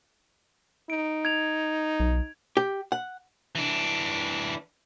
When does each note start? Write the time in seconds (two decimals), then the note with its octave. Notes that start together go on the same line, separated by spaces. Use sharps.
0.90 D#4 D7
1.25 G#6 F7
2.00 B1
2.57 G4
2.92 F#5
3.55 E3 D4